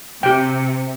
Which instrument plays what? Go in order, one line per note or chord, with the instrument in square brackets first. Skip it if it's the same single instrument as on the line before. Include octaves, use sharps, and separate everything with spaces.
[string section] C3 [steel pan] G4 G5